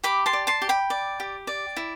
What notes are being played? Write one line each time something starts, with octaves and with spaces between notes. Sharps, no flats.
G4 B5 D6
A5 C6
D5
A5 C6
G4
G5 B5
D5
G4
D5
E4